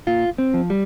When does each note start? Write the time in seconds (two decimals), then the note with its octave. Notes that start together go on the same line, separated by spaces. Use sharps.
0.07 A#2 F4
0.38 C4
0.54 F3
0.70 G3